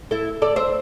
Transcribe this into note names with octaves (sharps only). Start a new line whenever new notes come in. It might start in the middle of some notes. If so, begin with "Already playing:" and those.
E4 A4
A4 D5
C5 E5